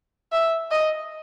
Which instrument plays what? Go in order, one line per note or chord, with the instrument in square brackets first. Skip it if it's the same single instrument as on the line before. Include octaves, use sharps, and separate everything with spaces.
[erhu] E5
D#5